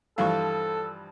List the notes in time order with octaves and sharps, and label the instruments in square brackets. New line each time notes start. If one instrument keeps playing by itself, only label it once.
[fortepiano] G2 E3 F3 [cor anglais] A4 [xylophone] F5 C#6